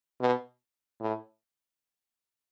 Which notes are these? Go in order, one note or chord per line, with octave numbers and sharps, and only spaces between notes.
B2
A2